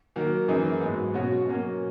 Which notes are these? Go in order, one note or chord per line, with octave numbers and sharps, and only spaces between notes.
D#3 F#3 A#3
F#2 E3 A#3 D#4 G#4
G#2 F#3 B3
B2 F#3 C#4 F#4
B2 F#3 A#3 C#4